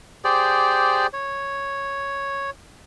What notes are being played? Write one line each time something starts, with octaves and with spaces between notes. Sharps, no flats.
G4 G#4 C5 D5
C#5